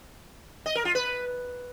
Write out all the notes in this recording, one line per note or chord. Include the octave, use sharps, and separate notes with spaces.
D#5
A#4
F4
B4